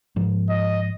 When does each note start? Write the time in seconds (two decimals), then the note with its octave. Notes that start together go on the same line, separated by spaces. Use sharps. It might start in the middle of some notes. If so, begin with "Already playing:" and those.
0.16 G#2 F3
0.49 D#5